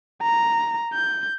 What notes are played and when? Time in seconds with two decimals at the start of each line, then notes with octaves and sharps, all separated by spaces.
0.22 A#5
0.93 G6